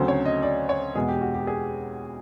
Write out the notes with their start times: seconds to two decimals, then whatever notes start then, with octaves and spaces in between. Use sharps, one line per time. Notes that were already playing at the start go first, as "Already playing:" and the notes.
Already playing: D2 C#3 F#3 A3 C4 C5
0.08 C#5
0.25 D#5
0.43 D5
0.69 C#5
0.95 E2 B2 G#3 G#4
1.09 G4
1.21 F#4
1.34 G4
1.47 G#4